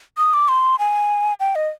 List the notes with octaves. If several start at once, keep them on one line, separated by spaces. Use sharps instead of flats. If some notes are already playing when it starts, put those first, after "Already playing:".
D#6
D6
C6
G#5
G5
D#5